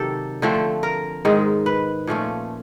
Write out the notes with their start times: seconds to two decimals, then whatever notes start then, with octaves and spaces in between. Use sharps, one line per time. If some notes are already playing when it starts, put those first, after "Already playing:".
Already playing: C3 D#3 F#3 G4 A4
0.42 D3 F3 A3 C4
0.83 A#4
1.25 G#2 D#3 G#3
1.66 B4
2.07 A#2 F3 A3 C#4